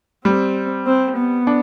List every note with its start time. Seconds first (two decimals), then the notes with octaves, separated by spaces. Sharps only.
0.25 G3 C4
0.87 C4
1.17 B3
1.47 D4